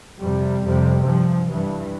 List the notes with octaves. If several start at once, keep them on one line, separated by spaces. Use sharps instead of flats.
F2 C3 G3
F2 C3
G2 F3
G2 E3